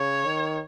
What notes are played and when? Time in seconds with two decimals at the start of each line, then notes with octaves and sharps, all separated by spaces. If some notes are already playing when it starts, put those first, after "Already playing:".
Already playing: C#3 C#5
0.26 D#3